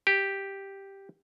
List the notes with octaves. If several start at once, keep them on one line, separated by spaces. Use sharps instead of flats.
G4